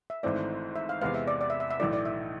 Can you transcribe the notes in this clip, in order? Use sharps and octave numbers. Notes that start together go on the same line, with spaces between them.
E5
G#1 G#2 E3 A3 C4 D5
E5
F5
E2 C3 G#3 B3 F5
E5
D5
D5
E5
E5
E5
B1 A2 E3 A3 D5
D5
E5